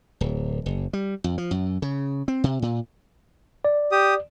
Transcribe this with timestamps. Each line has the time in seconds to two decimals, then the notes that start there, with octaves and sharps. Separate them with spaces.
0.21 D1
0.66 F#1
0.93 G3
1.24 F2
1.38 F3
1.51 F#2
1.82 C#3
2.28 C4
2.44 C3
2.62 A#2
3.65 D5
3.92 G4 D#6